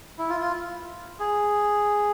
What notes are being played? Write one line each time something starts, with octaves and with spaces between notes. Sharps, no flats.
E4
F4
F4
G#4